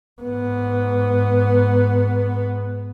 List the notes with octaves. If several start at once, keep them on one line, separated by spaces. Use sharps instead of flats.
G#2 B3